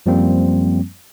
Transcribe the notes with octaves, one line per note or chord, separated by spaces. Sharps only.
F#2 F3 G3 A#3 C4